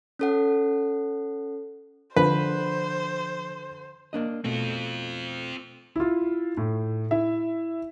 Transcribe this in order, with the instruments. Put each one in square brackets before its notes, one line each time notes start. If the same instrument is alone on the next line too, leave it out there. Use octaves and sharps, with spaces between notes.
[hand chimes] C#4 A4 F#5
[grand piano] D3 [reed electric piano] F3 [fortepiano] B4 [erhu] C5
[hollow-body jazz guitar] A#3 D4 D#5
[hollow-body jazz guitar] B2 A3 [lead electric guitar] C4 F4
[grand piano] E4 F4
A2
E4 E5